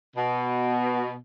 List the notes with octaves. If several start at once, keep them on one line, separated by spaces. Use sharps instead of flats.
B2